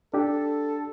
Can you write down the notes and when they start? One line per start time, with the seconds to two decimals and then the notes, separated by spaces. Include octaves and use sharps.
0.14 D4 G4 A4